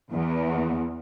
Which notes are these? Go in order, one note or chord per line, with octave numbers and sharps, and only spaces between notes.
E2